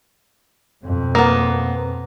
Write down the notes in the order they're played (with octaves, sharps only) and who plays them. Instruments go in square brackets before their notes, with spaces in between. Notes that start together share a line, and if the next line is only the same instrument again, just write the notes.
[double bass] F2 B2
[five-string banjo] A#3 B3